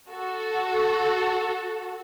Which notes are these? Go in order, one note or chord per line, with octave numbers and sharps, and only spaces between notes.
F#4 A4